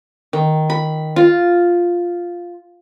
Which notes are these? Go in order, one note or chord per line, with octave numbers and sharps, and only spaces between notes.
D#3
B5
F4